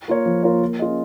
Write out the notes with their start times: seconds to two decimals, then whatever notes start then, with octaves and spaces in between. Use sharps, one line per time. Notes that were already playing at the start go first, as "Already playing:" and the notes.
0.08 A#3 F4 A#4 C#5
0.26 F3
0.43 A#3 F4 A#4 C#5
0.62 A#3
0.79 C#4 F4 G#4 D#5